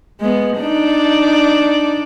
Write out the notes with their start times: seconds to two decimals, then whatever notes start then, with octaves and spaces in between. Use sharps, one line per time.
0.20 G#3 B3
0.60 D4 D#4 D5